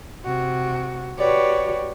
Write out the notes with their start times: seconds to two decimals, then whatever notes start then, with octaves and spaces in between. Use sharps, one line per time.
0.24 C3 F#4
1.17 F#4 G4 B4 C#5 D5